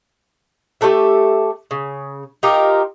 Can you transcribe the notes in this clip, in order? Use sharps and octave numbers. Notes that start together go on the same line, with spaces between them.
A3 G4 A4 E5
C#3
D#4 F4 G4 A#4